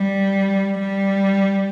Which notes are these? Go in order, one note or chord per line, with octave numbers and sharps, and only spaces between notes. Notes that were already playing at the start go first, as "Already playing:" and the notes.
Already playing: G3
G3